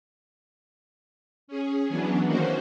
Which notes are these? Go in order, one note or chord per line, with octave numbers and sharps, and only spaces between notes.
C#4 G#4
E3 F#3 B3 C#4 D4
D#3 E3 A#3 C#4 F#4 C5